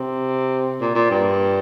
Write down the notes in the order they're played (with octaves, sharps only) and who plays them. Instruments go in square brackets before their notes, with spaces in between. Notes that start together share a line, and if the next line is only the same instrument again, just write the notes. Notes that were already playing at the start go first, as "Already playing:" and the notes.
Already playing: [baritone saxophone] C3
A#2
A#2
G2